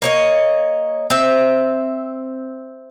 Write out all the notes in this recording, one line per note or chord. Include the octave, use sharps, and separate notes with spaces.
A#3 C#5 D#5
C4 E5